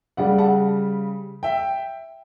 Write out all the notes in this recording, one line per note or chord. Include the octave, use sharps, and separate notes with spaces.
C#3 G3 D5 F#5
F#5 A5
E5 G5